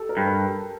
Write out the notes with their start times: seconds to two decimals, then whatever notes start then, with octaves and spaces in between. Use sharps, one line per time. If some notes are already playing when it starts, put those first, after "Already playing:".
Already playing: G4 A4
0.09 A#4
0.17 G2
0.25 B4